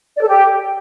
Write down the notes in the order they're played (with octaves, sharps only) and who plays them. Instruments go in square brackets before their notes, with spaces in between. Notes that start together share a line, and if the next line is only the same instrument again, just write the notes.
[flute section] D5
A4
G4